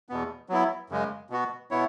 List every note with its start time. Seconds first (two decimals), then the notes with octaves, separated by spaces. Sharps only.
0.09 E2 B2 B3
0.49 F#3 B3 E4
0.90 F#2 C#3 G#3
1.30 B2 B3 F#4
1.71 B2 B3 E4 C#5